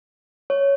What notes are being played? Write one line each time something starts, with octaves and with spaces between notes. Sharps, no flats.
C#5